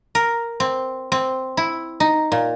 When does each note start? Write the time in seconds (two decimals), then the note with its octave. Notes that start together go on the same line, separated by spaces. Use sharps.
0.15 A#4
0.60 C4
1.12 C4
1.57 E4
2.00 D#4
2.32 A#2